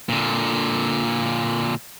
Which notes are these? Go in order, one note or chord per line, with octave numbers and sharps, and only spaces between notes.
A#2 D3